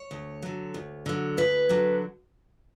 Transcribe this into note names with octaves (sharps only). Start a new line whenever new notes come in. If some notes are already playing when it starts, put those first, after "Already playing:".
Already playing: C#5
D2
D3 F#3
D2
D3 F#3
D2 B4
D3 F#3